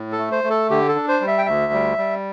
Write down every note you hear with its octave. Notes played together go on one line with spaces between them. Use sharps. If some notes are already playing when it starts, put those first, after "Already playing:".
Already playing: A2
A4
A3
C5
A3
A4
D3 G4
A4
D4
C5
G3
E5
G5
D2 E5
G3
G3